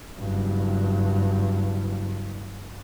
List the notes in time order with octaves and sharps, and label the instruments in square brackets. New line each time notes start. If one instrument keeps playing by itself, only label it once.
[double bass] F#1 G2